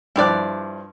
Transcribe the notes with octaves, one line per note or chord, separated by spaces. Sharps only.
G2 F3 E4 G4 D5 F#6